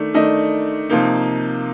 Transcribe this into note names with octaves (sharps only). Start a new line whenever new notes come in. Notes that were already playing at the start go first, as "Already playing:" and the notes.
Already playing: D#3 A3 D4
D#3 A3 D4 D#5
C3 F3 A#3 D#4